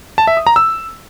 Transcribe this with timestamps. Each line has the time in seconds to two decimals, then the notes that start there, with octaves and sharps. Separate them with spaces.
0.18 A5
0.27 E5
0.37 D#6
0.47 A#5
0.56 E6